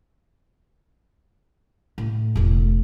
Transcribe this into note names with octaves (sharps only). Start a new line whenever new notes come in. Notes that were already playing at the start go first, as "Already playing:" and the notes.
A2
E1 A3